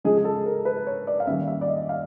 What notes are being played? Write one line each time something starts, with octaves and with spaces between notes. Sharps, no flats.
C#3 F3 G#3 G#4
G#4
A4
A#4
B4
C#5
D5
F5
D#3 G3 A#3 C#4 E5
E5
D5
D#5
F5